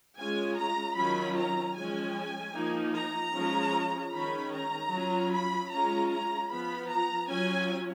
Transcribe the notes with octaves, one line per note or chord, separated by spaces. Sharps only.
G#3 C#4 F4 G#5
A#5
D#3 F#3 C#4 F4 B5
A#5
F3 G#3 C#4 G#5
F3 A#3 D#4
A#5
F3 G#3 C#4 F4
D#3 G#3 C#4 B5
A#5
F#3 C#4 F4
B5
G#3 C#4 F4 A#5
A#5
F3 B3 F4 B5
A#5
F#3 C#4 F4 G#5